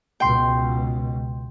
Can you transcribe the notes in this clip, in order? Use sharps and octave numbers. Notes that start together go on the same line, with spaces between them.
C#2 B2 G5 C6